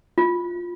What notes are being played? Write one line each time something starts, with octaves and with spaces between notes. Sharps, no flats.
F4